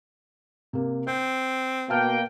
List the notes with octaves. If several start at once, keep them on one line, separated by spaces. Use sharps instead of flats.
C3 A#3
C4 G6
B2 A#3 F5 G5 A5 F6